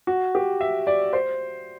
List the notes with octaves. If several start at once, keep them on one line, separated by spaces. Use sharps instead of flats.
F#4
G4
E5
D5
C5